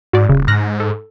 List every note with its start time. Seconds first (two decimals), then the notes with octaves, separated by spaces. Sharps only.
0.13 G#2 F#4 D5
0.29 D#1 C#3
0.48 G#2 F6 F#6 A#6
0.80 A4